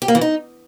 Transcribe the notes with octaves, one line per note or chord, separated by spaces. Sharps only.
G4
A#3
E3
D#4